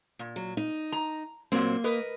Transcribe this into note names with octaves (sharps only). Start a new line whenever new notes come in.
A#2
F#3
D#4
A#5
A#2 F#3 A#3 C4
A#4 B4 D#5